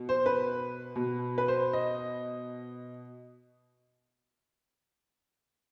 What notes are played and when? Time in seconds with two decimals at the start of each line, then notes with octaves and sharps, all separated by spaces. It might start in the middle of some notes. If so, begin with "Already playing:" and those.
Already playing: B2
0.09 C5
0.26 B4
0.96 B2
1.38 B4
1.48 C5
1.73 D#5